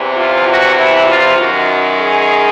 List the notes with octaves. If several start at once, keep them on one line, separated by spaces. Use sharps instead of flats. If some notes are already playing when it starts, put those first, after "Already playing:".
Already playing: E2 C3 E3
F4
F#4
E4
F4
F#2 D#3 F#4
G#4